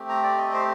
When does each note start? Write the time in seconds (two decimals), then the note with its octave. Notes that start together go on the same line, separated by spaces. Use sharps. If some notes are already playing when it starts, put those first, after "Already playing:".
Already playing: A3 C4 G4
0.09 A#5
0.24 D5
0.38 D#5
0.53 C5